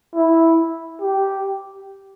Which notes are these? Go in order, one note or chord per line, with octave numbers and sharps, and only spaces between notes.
E4
G4